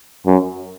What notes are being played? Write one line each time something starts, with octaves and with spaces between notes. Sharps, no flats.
F#2